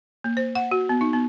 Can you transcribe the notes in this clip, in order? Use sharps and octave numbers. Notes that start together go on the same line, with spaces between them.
A#3
C5
F#5
F#4
B3
D#4
B3